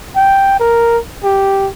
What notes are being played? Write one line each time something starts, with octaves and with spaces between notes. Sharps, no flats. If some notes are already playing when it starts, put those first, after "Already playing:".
G5
A#4
G4